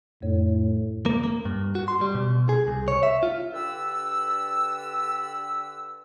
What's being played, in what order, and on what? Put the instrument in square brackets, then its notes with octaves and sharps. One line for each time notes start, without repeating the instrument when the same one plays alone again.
[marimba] F2 C#5 [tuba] A2
[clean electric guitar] A#3
A#3
G2
F#4
C6
G3
B2
G#4
C2
C#5
E5
F4
[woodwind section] D3 G4 B4 E6